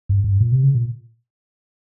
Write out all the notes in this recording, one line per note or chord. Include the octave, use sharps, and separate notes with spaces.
G2
G2
A#2
C3
C#3
A#2